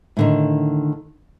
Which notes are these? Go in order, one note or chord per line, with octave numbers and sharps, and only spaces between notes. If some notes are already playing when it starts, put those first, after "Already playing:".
A2 D3 D#3